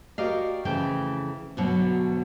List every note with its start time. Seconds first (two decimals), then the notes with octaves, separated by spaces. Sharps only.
0.18 F#4 G4 A#4 D5 D#5 F5
0.65 F2 C#3 E3 A3 E4 G5
1.57 D2 G2 B2 F#3 D4 C#5